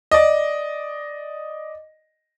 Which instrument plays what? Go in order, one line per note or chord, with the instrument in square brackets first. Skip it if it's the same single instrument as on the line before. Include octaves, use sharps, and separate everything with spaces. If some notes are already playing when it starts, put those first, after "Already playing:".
[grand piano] D5 D#5